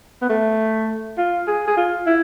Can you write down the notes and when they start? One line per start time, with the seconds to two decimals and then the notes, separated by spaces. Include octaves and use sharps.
0.21 B3
0.29 A3
1.18 F4
1.47 G#4
1.67 G#4
1.76 F4
2.06 E4